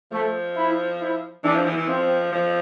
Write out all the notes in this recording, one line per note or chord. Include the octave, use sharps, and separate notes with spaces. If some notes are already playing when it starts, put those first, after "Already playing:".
F3 A3
E4
E4
E3 D4
F3
E3
E3
F3 C4
F3